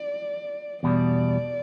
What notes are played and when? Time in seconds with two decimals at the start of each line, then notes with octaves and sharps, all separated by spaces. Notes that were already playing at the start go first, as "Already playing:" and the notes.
Already playing: D5
0.83 E2 B2 G3 D5